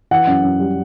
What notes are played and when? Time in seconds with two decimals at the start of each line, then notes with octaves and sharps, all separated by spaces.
0.11 E3 F#5
0.27 F#2
0.43 F#2
0.60 G3